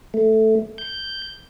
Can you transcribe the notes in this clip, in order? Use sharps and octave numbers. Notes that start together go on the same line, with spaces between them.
A3
G6